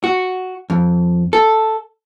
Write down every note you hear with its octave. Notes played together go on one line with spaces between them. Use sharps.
F#4
F2
A4